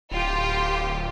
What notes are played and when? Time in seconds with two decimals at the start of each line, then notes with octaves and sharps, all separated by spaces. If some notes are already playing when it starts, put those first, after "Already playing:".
0.11 D1 F4 G4